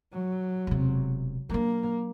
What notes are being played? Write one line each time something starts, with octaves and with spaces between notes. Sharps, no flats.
F#3
E1 C3
F#3 A#3 D4